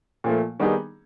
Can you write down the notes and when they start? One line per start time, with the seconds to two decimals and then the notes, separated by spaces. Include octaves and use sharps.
0.24 A#2 F3 A3
0.60 D#3 G3 B3 D#4 G#4